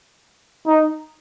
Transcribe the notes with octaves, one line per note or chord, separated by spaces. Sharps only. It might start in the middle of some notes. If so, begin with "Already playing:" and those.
D#4